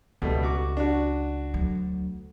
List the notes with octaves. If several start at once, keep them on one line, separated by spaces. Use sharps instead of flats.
C#2 B2 G3 A3
F#4 D6
D4 F#4
D2 F#3